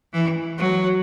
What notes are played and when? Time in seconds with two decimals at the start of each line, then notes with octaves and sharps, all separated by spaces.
0.13 E3
0.58 F#3